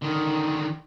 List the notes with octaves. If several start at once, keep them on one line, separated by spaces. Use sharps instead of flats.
D3 D#3